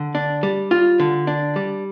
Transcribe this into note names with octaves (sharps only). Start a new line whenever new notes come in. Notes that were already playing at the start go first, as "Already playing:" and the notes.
Already playing: D3
D4
G3
F4
D3
D4
G3